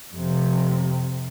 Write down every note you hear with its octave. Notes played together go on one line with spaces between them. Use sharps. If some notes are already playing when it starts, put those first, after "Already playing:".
F2 C3